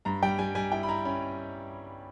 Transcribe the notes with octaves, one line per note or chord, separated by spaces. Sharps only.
G2 A#5
G3 G5
G3 G#5
G3 G#5
E4 G5
B5
E4 A#5
C#4 B5